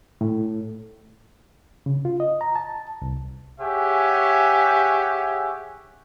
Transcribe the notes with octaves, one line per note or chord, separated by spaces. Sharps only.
A2
C#3
F4
D#5
A#5
A5
C2
G4 G#4 C#5 E5 F#5 G#5